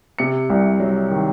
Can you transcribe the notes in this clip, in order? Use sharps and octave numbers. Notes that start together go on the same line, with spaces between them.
C3 C#7
C2
F#3
D#3